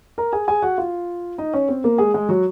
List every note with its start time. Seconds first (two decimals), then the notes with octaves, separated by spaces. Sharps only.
0.18 A#4 A#5
0.33 G#4 G#5
0.48 G#4 G#5
0.62 F#4 F#5
0.78 F4 F5
1.38 D#4 D#5
1.53 C#4 C#5
1.68 C4 C5
1.84 A#3 A#4
1.98 G#3 G#4
2.14 G#3 G#4
2.29 F#3 F#4